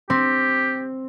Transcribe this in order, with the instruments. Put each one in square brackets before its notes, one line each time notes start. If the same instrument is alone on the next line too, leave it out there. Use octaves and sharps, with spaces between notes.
[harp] C4 [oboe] G4